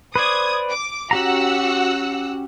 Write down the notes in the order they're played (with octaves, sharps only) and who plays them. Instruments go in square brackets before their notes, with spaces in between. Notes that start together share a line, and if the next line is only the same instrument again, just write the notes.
[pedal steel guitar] B4 C5 D5 [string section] D#6 G#6
[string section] D6
[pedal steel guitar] C#4 G4 A#5 [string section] F#4 F#5 E6